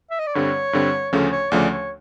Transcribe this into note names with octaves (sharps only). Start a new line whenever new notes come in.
E5
D#5
D5
G2 D3 G3 C4 C#5
G2 D3 G3 C4
D2 C#3 F3 A3 C#4
C#5
D2 C#3 F3 A3 C#4 D5
C#5